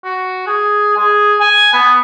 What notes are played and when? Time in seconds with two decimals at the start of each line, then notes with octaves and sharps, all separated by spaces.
0.04 F#4
0.47 G#4
0.97 G#4
1.40 G#5
1.73 B3